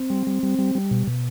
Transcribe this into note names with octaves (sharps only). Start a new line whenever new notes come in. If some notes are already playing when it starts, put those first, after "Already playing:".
Already playing: C4
G3
G3
G3
G3
G3
B2
B2